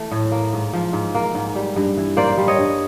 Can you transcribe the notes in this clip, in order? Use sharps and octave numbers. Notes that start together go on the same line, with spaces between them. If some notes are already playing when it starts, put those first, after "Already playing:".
Already playing: E3 A3
A2
A#3
G#2
F3
G#2
A#3
G#2
G3
G2
E3
A#3 C5 D5
G3
C#5 D#5
G2